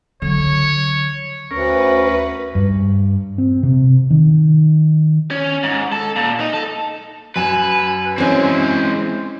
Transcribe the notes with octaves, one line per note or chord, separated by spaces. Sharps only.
D3 F#3 C#5
D2 C#4 A#4 B4
G2
C4
C3
D#3
C#4
G#2
A4
A#2
D#4
A4
F#2 B4 G#5 E7
E3 G#3 C4 C#4